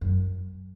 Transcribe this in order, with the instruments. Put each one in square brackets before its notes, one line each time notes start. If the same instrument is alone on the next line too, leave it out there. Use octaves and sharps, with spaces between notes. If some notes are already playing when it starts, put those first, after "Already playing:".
[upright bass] F#2